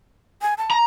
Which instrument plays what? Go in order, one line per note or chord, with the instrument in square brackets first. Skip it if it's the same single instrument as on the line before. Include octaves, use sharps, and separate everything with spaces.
[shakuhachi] G#5
A5
[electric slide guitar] A#5